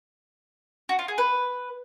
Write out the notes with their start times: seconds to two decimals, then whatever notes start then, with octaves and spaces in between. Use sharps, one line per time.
0.89 F#4
0.99 F4
1.08 G#4
1.18 B4